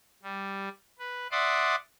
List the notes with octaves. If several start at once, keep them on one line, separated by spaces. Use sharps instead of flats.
G3
B4
D5 E5 F#5 C6 D6 D#6